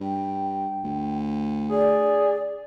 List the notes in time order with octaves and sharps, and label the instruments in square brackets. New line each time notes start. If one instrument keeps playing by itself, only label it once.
[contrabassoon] G2 [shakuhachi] G5
[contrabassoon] D2
[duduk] G#4 [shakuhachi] D5